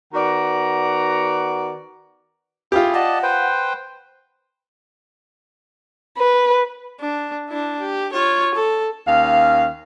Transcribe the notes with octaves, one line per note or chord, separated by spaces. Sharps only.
D#3 B3 F#4 D5 F#5 A#5
E4 F4 G4 G#4
D5 D#5 F#5 A5
B4 C5 G5
B4
D4
D4 E4
G4
F4 C#5
A4
D#2 C#4 F5